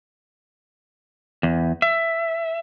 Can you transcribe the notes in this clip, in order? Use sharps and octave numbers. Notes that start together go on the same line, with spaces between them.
E2
E5